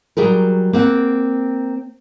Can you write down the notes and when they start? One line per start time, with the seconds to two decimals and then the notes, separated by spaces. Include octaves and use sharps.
0.17 F#3 G3 G#4 A#4
0.73 A#3 C4 F#5